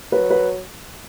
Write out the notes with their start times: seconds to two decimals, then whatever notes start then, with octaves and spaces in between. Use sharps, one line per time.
0.12 F#3 B4
0.30 B4